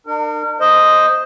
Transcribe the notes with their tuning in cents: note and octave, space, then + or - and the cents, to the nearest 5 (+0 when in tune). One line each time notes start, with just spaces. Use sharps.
D4 +45 A#4 -30
A3 -20 C5 +0 D#5 +0